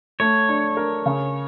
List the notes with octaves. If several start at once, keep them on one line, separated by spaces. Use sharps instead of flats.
A3 C#5
D4
A#4
C#3